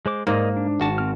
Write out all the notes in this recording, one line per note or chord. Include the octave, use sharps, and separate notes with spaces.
G#3 C5 D6
G#2 A#3 A#4 D5 D#5
D4
G#1 F#4 A5
C4 F6